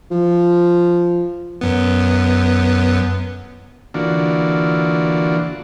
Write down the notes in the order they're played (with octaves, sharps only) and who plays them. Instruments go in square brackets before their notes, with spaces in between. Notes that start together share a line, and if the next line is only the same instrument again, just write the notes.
[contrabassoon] F3
[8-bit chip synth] F#2 B3
[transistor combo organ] D3 E3 A#3 D4 F4 F#4